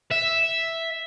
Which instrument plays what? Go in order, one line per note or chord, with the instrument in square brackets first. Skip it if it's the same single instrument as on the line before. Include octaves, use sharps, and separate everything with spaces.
[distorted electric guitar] E5